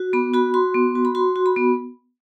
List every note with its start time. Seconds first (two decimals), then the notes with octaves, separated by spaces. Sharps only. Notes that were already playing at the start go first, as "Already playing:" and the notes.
Already playing: F#4
0.13 B3 B5
0.34 F#4 B5
0.54 F#4 C6
0.75 B3
0.95 F#4
1.05 B5
1.15 F#4 C6
1.36 F#4
1.46 B5
1.56 B3